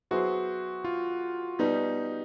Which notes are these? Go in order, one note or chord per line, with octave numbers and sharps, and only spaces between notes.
F#3 B3 E4 F#4 G#4 C5
F4
B2 G3 B3 D#4